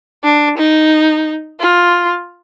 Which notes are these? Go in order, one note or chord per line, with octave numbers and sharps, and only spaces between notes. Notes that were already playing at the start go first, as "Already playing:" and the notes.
D4
D#4
F4